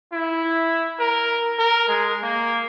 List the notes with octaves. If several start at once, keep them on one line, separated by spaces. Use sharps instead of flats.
E4
A#4
A#4
G#3
A#3